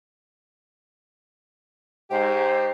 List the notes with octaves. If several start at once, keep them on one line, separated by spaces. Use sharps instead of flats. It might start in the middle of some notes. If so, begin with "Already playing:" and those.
G#2 G4 C5